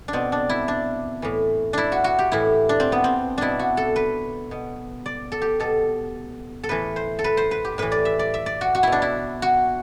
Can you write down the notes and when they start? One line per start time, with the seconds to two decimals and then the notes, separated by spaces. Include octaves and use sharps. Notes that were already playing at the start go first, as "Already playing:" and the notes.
0.08 D4
0.13 B2 C4
0.32 D4
0.50 E4
0.68 D4
1.22 A2 E3
1.73 D4 E4
1.92 F#4
2.04 F#4
2.19 G4
2.32 A2 E3 E4
2.69 D4
2.80 C4
2.92 B3
3.04 C4
3.38 B2 D4 E4
3.59 F#4
3.77 A4
3.96 B4
4.51 B2
5.06 D5
5.32 A4
5.42 G4
5.60 B2 A4
6.64 A4
6.69 A2 E3 B4
6.96 C5
7.19 A4
7.24 B4
7.37 C5
7.51 B4
7.65 G4
7.78 A2 E3 B4
7.92 D5
8.05 E5
8.19 D5
8.34 E5
8.46 D5
8.61 F#4
8.75 F#4
8.83 B2 E4
8.92 D4
9.02 E4
9.42 F#4